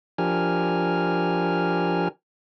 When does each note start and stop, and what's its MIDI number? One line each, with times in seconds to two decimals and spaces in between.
0.18 2.08 53
0.18 2.08 62
0.18 2.08 67
0.18 2.08 70
0.18 2.08 80
0.18 2.08 89